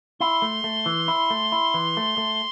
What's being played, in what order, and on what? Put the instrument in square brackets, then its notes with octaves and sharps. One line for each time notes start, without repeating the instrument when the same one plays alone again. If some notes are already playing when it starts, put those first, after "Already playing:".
[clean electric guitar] E4 [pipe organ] C6
[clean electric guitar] A3
A3
E3
E4
A3
E4
E3
A3
A3